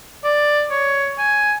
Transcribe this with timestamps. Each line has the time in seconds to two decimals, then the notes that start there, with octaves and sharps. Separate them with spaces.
0.24 D5
0.70 C#5
1.18 G#5